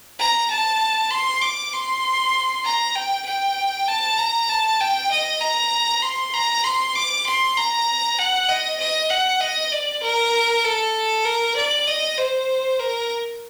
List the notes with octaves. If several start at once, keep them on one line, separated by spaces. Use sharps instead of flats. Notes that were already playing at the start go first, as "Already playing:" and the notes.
A#5
A5
C6
D6
C6
A#5
G5
G5
A5
A#5
A5
G5
D#5
A#5
C6
A#5
C6
D6
C6
A#5
F#5
D#5
D#5
F#5
D#5
D5
A#4
A4
A#4
D5
D#5
C5
A#4